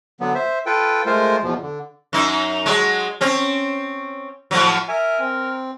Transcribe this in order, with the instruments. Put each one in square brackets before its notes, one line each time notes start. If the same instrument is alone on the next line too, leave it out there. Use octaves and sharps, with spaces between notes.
[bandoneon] D3 F#3 B3
C5 E5
F4 A4 B4 G5
G#3 A3 F4 A#4 C5
E2 B2 F3
D3
[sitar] F#2 D#4
F#3 G#3
C4 C#4
A2 F3 F#3
[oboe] A#4 [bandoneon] E5 G#5
[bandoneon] C4